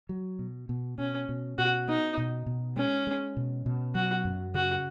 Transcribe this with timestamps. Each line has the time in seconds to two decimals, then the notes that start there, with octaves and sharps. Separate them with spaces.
0.09 F#3
0.39 B2
0.69 B2
0.98 B2 C#4
1.29 B2
1.58 B2 F#4
1.88 B3 D#4
2.17 B2
2.46 B2
2.76 G#3 C#4
3.07 G#3
3.37 B2
3.66 B2
3.95 F#3 F#4
4.25 F#2
4.54 C#3 F#4